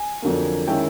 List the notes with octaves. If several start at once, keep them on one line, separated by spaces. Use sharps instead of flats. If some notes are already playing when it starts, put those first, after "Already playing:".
Already playing: G#5
F2 D3 F#3 A#3
D#3 G#3 C#4 E4 G5